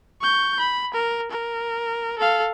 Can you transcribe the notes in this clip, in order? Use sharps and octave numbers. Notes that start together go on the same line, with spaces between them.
C#6 G6
B5
A#4
A#4
A4 F5